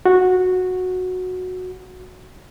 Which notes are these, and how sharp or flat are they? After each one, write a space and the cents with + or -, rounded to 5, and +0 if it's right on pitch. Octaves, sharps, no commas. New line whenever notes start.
F#4 -10